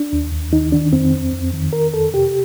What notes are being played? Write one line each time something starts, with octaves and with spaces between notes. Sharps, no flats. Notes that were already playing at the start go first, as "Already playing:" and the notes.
Already playing: D4
D#2
D#2
D#3 D#4
D#3 D4
F2 C4
F2
F2
D#3
D#3 A#4
F2 A4
C3 G4